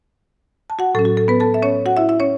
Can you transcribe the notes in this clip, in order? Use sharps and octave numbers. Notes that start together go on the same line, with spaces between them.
A5
F#4 F#5
A2 F#3 C#4 A4
F#4
A4
B3 B4
A4 A5
E5
C#4 C#5
F#4 F#5
E4 E5
E4 E5
C#4 C#5